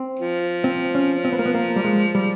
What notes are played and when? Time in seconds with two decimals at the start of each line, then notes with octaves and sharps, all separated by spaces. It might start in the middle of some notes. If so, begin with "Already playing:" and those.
Already playing: C4
0.19 F3
0.64 C4
0.95 C#4
1.25 C4
1.33 B3
1.39 A#3
1.46 B3
1.55 A#3
1.76 G3
1.84 G#3
2.15 G3